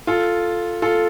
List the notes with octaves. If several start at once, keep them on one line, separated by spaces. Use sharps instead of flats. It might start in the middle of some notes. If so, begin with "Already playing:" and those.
F4 A4
F4 A4